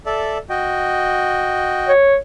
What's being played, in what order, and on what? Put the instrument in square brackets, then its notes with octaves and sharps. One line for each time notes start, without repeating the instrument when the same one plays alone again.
[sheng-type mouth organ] A4 D5 E5
F#4 D#5 G5
[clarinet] C#5